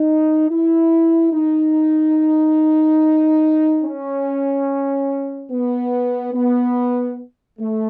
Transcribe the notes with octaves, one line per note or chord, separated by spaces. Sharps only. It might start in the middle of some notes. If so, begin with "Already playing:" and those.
Already playing: D#4
E4
D#4
C#4
B3
B3
A3